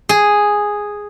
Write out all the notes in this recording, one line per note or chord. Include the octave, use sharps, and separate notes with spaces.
G#4